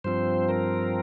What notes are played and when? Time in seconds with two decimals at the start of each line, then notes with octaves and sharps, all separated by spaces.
0.04 G2 F3 C4 C5
0.49 A#4